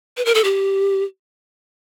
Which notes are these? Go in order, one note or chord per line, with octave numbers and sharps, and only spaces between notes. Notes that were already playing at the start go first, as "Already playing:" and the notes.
B4
A#4
A4
G4